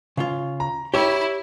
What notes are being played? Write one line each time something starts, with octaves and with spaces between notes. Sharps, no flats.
C#3 F4
A#5
E4 G4 C#5 E5